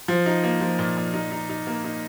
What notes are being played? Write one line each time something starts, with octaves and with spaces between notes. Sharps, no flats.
F3
D#4
A#3
F3
A#2
A#2
D#4
D#4
D#4
A#3
D#4